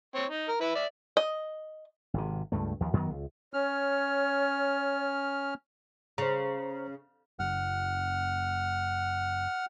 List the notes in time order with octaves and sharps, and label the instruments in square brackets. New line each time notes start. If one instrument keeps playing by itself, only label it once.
[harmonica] C4 C#5
D#4
A#4
E4 B4
D5 E5
[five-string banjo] D#5
[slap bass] G#1 C3
C#2 G2 A3
D#2 F3
F#2 D#3 F#3 B3
C#2
[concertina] C#4 F6 [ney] C#5
[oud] C#3 [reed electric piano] C5 A#5
[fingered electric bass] F#1 [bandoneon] F#5 F6